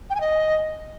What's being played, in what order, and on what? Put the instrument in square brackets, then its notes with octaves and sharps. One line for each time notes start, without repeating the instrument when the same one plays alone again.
[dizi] G5
G#5
D#5